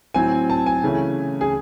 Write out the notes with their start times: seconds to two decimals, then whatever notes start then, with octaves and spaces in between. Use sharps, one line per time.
0.14 A2 F#3 C4 G#5
0.50 A5
0.66 G#5
0.83 C#3 E3 A3 C#4
1.41 G#4